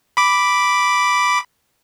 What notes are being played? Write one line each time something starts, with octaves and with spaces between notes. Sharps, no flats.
B5 D6